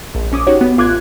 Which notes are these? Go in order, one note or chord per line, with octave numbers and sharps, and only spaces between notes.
A#1
A#1 C#4 D6 D#6
D#4 F#4 G4 C#5
B3
A1 F4 D6 F#6 G#6